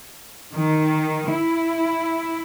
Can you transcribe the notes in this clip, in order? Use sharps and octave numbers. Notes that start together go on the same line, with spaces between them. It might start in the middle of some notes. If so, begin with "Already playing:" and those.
D#3
E4